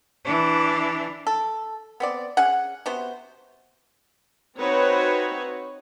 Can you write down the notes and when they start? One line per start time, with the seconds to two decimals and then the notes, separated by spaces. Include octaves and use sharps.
0.25 E3 D4
1.27 A4
2.00 B3 C4 D5
2.37 C#4 G#4 F#5
2.86 C3 B3 F#4 C5
4.59 C4 D#4 F#4 B4 C#5